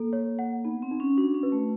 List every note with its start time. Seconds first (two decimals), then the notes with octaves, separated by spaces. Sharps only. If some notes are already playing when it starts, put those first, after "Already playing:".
Already playing: A#3 A4
0.13 C#5
0.39 F#5
0.65 B3 D#4
0.82 C4
0.91 D#4
1.00 C#4
1.18 D4 F#4
1.34 C#4
1.43 B4
1.52 A3